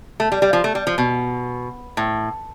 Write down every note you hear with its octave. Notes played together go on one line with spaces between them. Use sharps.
A3
G3
G3
F3
A3
G3
F3
B2
A2